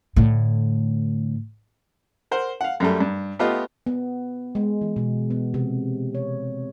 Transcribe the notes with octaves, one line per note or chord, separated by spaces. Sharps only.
A2 D3
A#4 C5 F#5
F5 F#5
F#2 G3 A3
G2
A3 B3 F4 G4 D#5
B3
G#3
E3
B2
B3
C3
C#5